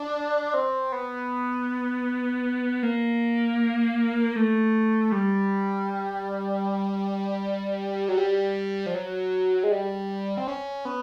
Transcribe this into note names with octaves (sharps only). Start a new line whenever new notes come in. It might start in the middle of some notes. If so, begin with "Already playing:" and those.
Already playing: D4
C4
B3
A#3
A3
G3
F#3
G3
F3
F#3
G#3
G3
C4
C#4
B3